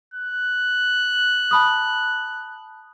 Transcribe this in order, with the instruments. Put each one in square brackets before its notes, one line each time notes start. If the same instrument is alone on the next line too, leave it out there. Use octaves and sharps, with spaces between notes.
[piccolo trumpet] F#6
[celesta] A5 B5 D#6